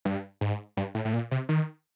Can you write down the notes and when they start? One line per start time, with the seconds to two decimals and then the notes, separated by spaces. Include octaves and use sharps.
0.05 G2
0.41 G#2
0.77 G2
0.95 A2
1.05 A2
1.13 A#2
1.31 C3
1.49 D#3